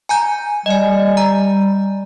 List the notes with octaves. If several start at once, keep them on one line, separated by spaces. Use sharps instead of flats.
G#5 A#5 G6
G3 D#5 G#5
A#5